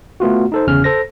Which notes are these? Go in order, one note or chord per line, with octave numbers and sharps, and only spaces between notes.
A3 B3 F4 F#4
D#4 A4 C5
G1 E2 C#3 C#4 F6
A4 C5 A#6